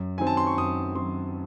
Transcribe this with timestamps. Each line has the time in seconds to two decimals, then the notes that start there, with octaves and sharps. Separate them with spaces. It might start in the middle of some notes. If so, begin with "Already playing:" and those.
Already playing: F#2
0.18 D#3 F#3 C4 G#5
0.27 A5
0.37 C6
0.47 C#6
0.57 F#2 D#6
0.95 D#3 F#3 C4 C6